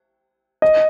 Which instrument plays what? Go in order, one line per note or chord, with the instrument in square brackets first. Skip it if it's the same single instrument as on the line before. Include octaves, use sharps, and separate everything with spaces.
[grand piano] D#5